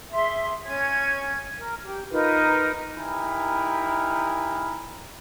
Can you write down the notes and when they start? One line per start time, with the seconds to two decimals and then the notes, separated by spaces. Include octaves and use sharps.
0.12 G#4 E5 C6
0.65 C#4 C#5 G#5 G#6
1.56 A#4
1.84 G4
2.10 D#4 F4 A#4 B4
2.96 D#4 E4 G4 A#4 G#5 B5